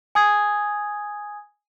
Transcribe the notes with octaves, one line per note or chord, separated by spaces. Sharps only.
G#5 D#6 G#6